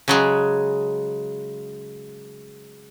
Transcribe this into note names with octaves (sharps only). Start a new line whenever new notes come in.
C#3 F#3 G#3